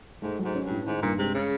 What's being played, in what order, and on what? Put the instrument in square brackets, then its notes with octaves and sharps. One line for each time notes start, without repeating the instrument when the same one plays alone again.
[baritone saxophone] G#2 [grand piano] A3
[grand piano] F#3
[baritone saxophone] G#2
[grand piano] C#4
[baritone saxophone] G2
[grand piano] A2
[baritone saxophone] G#2 [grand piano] D#3
[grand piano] G2 [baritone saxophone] A#2
[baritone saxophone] C3 [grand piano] G#3
[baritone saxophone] C#3